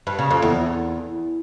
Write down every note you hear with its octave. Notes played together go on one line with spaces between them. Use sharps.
G2
C#3
F2
E2